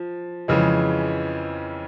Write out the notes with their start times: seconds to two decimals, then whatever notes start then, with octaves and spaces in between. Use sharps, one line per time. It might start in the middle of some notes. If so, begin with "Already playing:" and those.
Already playing: F3
0.48 F2 C#3 E3 G#3